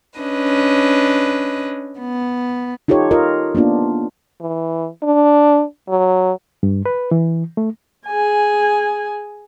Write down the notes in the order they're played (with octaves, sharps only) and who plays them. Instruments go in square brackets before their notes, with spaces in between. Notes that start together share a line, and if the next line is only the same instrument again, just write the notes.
[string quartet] C#4 D4 B4 D#5
B3
[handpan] D#4 F4 G4 A4 C#5
F4 A#4 D#5
A#3 B3 D4 F4
[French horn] E3
D4
F#3
[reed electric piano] G2
B4
E3
A3
[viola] G#4 G#5